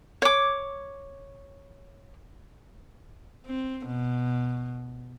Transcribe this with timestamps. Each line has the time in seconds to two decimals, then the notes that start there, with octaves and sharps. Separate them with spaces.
0.22 C#5 D6
3.46 C4
3.87 B2